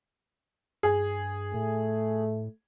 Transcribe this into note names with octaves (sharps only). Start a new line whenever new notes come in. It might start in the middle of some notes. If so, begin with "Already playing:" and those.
G2 G#4
A2 A3